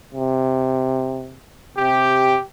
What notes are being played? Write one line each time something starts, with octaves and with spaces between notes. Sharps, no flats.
C3
C3 G4